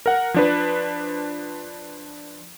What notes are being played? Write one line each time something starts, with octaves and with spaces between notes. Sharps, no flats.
A#4 F#5
F3 D4 B4